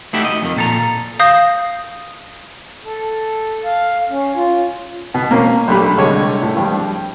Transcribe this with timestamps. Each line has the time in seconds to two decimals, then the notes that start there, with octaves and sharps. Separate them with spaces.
0.13 A3 D#4 E4 F#4 G4
0.25 D#5
0.42 F2 D#3
0.56 A#2 A4 A#5
1.19 F5 D#6 G6 A#6
2.85 A4
3.65 F5
4.10 C#4
4.36 F4
5.14 B2
5.31 A#3 C4 C#4
5.68 B1 A3 D4 G4 B5
5.97 C2 D3 G#3 C#5 A5
6.42 A2
6.57 G2 F3 G3